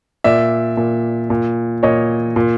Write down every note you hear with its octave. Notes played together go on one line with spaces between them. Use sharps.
A#2 D5 E5
A#2
A#2
A#2 C#5 D#5
A#2